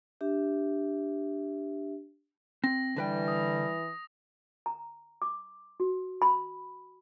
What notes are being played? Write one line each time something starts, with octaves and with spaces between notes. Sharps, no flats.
D4 G4 E5
C4 A#6
D3 E3 G3 B4 G5
D#6
A#5
D6
F#4
B5